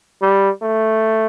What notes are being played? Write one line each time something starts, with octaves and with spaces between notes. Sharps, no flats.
G3
A3